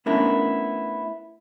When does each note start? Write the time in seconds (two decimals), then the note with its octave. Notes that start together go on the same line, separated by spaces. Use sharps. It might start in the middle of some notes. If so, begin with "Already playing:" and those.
0.06 A3 B3 C#4 D4 E4 A#4